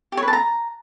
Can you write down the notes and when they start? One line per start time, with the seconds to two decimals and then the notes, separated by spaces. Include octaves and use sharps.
0.12 G4
0.17 C#5
0.23 B4
0.28 A5
0.33 A#5